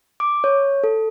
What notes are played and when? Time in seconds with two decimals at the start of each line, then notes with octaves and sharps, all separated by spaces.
0.20 D6
0.44 C#5
0.84 A4